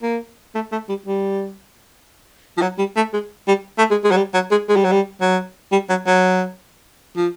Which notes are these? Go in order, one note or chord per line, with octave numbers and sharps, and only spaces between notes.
A#3
A3
A3
G3
G3
F3
F#3
G3
A3
G#3
G3
A3
G#3
G#3
F#3
G3
F#3
G#3
G#3
G3
F#3
G3
F#3
G3
F#3
F#3
F3